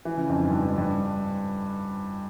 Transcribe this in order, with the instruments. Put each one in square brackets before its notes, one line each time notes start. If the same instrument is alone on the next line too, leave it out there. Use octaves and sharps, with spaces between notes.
[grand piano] E3
C#3
F2
G#2
G2
G#2
G2